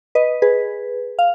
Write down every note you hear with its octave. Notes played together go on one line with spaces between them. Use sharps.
B4 D#5
G#4 B4
F5